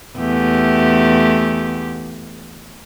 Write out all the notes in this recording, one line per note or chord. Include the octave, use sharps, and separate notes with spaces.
E2 A3 G4